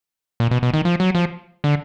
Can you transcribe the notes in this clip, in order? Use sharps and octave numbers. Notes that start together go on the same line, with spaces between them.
A#2
B2
B2
D#3
F3
F#3
F3
D3